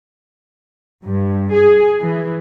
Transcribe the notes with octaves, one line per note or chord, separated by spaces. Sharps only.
G2
G#4
E3